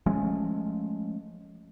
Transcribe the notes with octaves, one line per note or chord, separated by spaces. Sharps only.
F3 G#3 A3 C#4